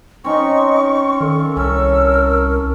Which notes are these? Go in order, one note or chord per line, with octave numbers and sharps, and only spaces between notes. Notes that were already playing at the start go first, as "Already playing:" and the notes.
C4 C#4 D#4 C5 C#6
D#3 A4 F5
C2 C#4 A4 A#4 C#5 E6